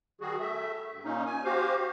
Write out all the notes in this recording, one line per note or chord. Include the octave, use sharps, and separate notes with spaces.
D#3 G3 F#4 G#4
A3 E5
G2
A#2 A#3 C#4 D#4
G#5
F#4 G4 C5 F5